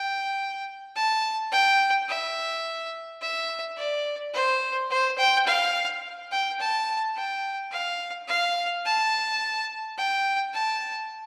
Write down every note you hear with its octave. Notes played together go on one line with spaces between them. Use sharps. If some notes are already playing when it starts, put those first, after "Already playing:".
Already playing: G5
A5
G5
E5
E5
D5
C5
C5
G5
F5
G5
A5
G5
F5
F5
A5
G5
A5